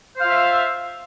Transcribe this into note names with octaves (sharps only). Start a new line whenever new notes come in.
F4 C5 E5 F5